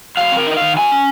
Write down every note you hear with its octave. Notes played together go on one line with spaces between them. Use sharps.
F#3 F5
C4 A#4
D#4 D#5
D#3 F5
F#3 G#5
C#4